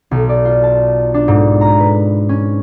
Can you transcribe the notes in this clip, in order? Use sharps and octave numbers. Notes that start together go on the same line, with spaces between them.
B1
D5
F4
A5
D4
G#2
A#5
B4
C#4